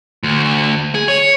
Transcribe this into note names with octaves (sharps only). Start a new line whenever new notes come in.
D2
G#4
C#5